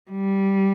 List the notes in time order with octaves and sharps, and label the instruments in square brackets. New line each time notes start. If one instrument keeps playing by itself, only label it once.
[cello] G3